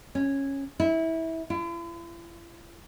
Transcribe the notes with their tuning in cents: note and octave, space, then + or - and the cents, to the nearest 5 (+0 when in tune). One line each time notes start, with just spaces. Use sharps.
C#4 -10
E4 -20
E4 +45